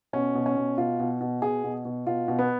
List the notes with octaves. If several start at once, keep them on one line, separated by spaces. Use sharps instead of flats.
B2 C#4
B2
C#4
B2
B2 F4
B2
B2
B2 G#4
B2
B2
B2 F4
B2
B3